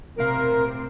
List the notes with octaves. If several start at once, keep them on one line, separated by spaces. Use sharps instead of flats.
B1 A2 C3 C4 A#4 F5